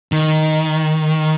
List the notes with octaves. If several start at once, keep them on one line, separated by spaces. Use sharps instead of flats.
D#3